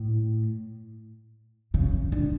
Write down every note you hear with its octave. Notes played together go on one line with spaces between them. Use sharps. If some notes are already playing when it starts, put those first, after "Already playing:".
Already playing: A2
C#3
D3